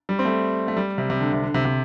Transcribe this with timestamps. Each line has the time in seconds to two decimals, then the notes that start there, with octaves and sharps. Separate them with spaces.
0.09 G3
0.19 C4
0.25 A3
0.68 A3
0.77 G3
0.98 C3
1.10 C3
1.20 D3
1.33 C3
1.43 D3
1.54 C3
1.65 C3